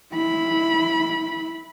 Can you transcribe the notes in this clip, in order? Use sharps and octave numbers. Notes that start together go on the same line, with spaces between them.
E4 B5